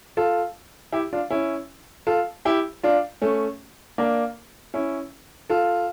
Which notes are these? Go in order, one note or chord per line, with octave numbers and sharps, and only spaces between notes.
F4 A4
E4 G4
D4 F4
C#4 E4
F4 A4
E4 G4
D4 F4
A3 C#4
A#3 D4
C#4 E4
F4 A4